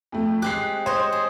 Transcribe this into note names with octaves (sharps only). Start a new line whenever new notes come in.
F2 A3
G#3 C4 G4 F#6 C7
C5 C#5 D#5
G#4